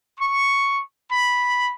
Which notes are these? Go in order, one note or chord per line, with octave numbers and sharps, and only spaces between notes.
C#6
B5